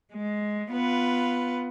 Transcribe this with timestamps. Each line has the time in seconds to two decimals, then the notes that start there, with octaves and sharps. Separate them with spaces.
0.12 G#3
0.72 B3 F4 B4